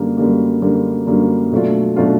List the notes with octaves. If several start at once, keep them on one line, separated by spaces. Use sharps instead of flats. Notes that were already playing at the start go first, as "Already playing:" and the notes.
Already playing: F#2 D3 G3 A#3
F#2 D3 G3 A#3
F#2 D3 G3 A#3
F#2 D3 G3 A#3
B2 F#3 A3 D4 F4
B2 F#3 A3 D4 F4